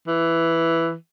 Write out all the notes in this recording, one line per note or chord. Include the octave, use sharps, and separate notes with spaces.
E3